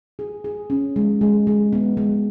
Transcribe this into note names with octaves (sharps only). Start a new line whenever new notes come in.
G#4
G#4
C#4
G#3
G#3
G#3
B3
G#3